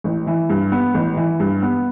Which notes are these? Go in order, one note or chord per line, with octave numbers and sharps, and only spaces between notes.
A1
E3
G2
B3
A1
E3
G2
B3